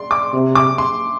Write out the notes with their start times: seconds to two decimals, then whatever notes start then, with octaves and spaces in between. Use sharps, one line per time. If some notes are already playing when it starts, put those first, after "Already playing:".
Already playing: D5 C6
0.11 D6
0.33 C3
0.55 D6
0.78 C6